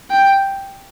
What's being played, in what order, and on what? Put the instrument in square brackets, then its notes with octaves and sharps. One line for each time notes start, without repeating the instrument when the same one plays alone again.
[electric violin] G5